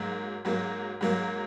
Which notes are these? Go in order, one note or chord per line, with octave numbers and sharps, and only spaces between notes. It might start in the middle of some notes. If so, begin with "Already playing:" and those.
Already playing: G#2 F#3 A#3
G#2 F#3 A#3
G#2 F#3 A#3